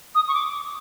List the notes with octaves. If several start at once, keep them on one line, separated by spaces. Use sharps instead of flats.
D#6
C#6
D6